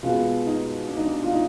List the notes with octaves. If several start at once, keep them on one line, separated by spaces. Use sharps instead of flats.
B2 G#3 B3 F4
D#4
D4
D#4
D4
F4
D#4